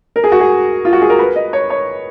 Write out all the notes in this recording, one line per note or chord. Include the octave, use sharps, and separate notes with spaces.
A#4
G#4
F#4
G#4
F4
F#4
G#4
A#4
B4
D#5
C#5
C#5